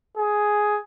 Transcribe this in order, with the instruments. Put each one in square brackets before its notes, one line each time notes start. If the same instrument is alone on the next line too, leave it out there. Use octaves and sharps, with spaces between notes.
[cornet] G#4